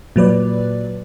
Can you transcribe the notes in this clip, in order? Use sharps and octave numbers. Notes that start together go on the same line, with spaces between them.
A#2 F#3 B4 D5